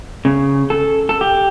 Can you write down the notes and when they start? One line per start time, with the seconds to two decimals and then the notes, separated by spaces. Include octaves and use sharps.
0.25 C#3
0.70 A4
1.09 A4
1.21 G4